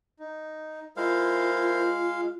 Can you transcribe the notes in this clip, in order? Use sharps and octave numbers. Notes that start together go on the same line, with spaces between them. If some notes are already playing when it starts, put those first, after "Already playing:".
D#4
G#3 E4 F4 A#4 C5 F5